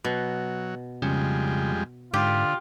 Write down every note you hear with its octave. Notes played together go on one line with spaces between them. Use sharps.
B2 F#3
F2 C#3 G3 G#3
G#2 D3 F4 G4